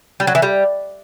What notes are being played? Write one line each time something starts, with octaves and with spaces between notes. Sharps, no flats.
G3
F#3
E3
G3